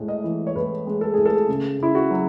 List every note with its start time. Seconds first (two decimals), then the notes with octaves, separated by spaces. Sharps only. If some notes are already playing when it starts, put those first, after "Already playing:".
Already playing: A2 G#3
0.08 D#5
0.24 E3
0.47 C#5
0.56 A2 B4
0.87 G#3
1.01 A4
1.14 A2 G#4
1.26 A4
1.48 C#3
1.79 C#3 E4
1.95 F#4
2.11 F#3